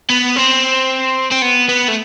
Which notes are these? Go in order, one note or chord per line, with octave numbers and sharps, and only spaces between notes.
B3
C4
C4
B3
B3
A3